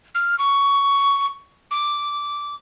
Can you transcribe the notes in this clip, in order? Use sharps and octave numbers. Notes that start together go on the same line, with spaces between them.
F6
C#6
D6